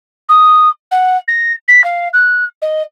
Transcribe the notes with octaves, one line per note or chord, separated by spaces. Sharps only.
D#6
F#5
A#6
B6
F5
F#6
D#5